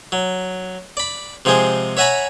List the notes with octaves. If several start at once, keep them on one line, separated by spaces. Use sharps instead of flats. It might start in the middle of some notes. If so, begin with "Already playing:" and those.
F#3
D5 B5
C3 F3 G#3 G#4 C5
C#5 E5 F#5 G#5 A#5 B5